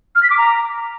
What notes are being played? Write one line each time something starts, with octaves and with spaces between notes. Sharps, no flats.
F6
B6
D6
A#5